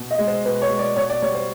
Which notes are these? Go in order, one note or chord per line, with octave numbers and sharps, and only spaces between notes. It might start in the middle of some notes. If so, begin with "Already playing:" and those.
Already playing: B2
D#5
G#3
C5
B2 B4
C#5
G#3
D5
B2 C#5
D5
G3 C#5
C5